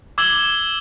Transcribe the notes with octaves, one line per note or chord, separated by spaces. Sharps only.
D6 E6 G#6 F#7 G7